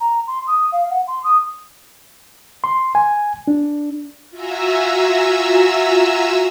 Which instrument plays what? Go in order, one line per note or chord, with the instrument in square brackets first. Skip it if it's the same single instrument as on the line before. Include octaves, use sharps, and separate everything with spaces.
[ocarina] A#5
C6
D#6
F5
F#5
C6
D#6
[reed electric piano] C6
G#5
D4
[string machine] F4 F#4 E5 G#5 A#5 E6